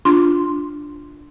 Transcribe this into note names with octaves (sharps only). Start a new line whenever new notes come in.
D4 F4 C6